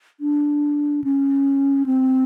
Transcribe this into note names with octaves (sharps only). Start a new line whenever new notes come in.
D4
C#4
C4